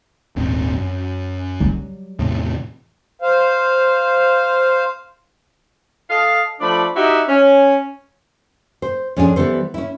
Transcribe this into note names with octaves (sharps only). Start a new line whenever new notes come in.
D#1 G#1 C4
F#2
F#3 G3
E2 A2 C3
C5 F5
A4 D#5 F5
F3 A3 D4 D5 B5
D#4 E4 F#4 G4 E5
C#4
C5
F2 C#4 D4 F#4 G#4
E3 G3 B3 A4 C5
C#4 E4